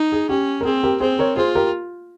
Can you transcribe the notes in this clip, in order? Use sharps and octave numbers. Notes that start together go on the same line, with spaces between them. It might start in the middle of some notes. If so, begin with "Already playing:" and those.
Already playing: D#4
G#4
C#4 G4
A#4
C4 G#4
G4 A#4
C4 G#4 C5
A#4 C#5
F4 G#4 C5
G4 A#4